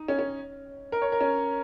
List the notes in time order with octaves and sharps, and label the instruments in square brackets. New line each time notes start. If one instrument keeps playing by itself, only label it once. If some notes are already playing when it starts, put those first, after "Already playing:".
Already playing: [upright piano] D#4
C#4
C#4
A#4
C#5
A#4
C#4